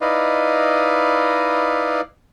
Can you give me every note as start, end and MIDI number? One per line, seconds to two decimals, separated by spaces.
0.01 2.01 63
0.01 2.01 64
0.01 2.01 71
0.01 2.01 74
0.01 2.01 75
0.01 2.01 77